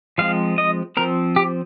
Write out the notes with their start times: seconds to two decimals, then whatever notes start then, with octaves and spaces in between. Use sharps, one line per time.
0.18 F3 G#3 C4 F5
0.58 D#5
0.97 F3 C4 A#4
1.36 G4